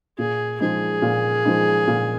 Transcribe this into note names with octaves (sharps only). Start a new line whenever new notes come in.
A#2 G#4
F3 G#3 D#4 G#4
A#2
F3 G#3 D#4
A#2